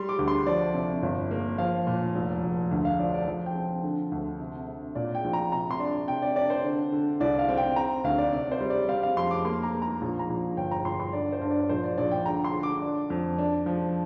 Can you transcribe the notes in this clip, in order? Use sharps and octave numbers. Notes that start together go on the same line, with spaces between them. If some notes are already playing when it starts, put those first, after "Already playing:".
Already playing: G3 C6
D6
D2
C6
F3 D5
C3
G1
A#3
F3 F5
A#2
F1
F1
D2
F5
F3 D5
D5
F3
G5
C4
D3
D2
C3
C3
A#2 D5
G5
A#1
A#5
C3 A#5
C6
D4
C3 G5
D5
D4 D5
C5
D3
D3
C2 D5
F5
C4
G5
C4 A#5
D2 F5
D5
C3 D5
C5
G3
D5
C4 F5
F5
F2 C6
D6
A#3 C6
A#5
A#3
A#5
A#1
A#5
A#1
G1 G5
A#5
G1 C6
C6
D3 D5
C5
G2
D5
A#1 C5
D5
A#1 D5
G5
D3 A#5
C6
D3
D6
D4
F2
D4
F3